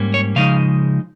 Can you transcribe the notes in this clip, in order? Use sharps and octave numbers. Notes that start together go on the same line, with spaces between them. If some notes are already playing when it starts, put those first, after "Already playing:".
Already playing: G#2 G3 A#3 C#4
C#5
C#3 F3 G#3 D#4 F5